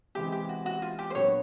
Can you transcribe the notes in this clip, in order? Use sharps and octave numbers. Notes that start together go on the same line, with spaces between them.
C3 E3 G#3 G4
G4
F#4
F#4
F4
G4
C5
A#2 F#3 B3 D4 F#4 C#5